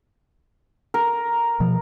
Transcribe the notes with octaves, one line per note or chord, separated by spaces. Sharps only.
A#4
B2 F3